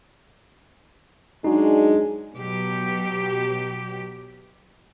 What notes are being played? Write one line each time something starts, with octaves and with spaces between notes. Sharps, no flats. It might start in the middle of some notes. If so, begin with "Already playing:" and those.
F#3 G#3 D4 D#4 F#4
B2 F#3 G4